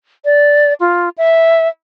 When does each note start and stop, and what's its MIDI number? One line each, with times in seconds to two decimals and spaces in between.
0.25 0.73 74
0.80 1.09 65
1.18 1.68 76